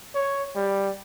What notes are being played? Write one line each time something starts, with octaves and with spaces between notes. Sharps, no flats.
C#5
G3